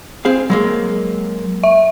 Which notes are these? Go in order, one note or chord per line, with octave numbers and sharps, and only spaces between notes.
C4 G#4 F5
F#3 G#3 A#3
E5